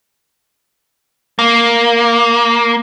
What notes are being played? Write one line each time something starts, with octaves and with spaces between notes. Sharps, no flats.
A#3